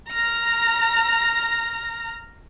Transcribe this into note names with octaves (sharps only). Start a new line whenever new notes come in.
A#5 F6 A#6